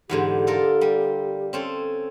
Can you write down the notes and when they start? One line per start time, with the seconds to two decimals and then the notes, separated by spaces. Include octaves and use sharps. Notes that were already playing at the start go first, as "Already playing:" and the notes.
0.09 E2 G#2 D3 G4
0.47 F4 A4 A#4
0.81 G3
1.53 C4 C#4 A4